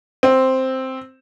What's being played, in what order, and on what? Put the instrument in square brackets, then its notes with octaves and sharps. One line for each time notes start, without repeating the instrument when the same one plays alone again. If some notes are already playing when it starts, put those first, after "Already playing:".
[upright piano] C4